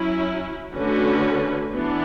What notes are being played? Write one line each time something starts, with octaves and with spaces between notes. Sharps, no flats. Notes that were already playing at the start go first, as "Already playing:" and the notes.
Already playing: F#3 C#4 E4
D3 A3 C#4 F#4 B4
E3 B3 D4